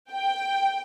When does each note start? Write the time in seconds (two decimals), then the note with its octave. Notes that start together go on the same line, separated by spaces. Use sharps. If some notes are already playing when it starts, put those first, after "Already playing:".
0.12 G5